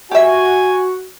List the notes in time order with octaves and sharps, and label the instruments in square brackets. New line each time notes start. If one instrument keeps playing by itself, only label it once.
[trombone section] F#4 [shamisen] G4 E5 [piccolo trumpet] G#5